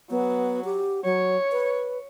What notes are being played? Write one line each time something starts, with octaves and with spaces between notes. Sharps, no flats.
F#3 B3
G4
F#3 C#5
B4